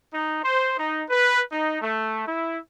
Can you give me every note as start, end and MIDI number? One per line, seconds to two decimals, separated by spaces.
0.14 0.42 63
0.44 0.73 72
0.78 1.04 63
1.09 1.42 71
1.52 1.80 63
1.82 2.27 57
2.27 2.59 64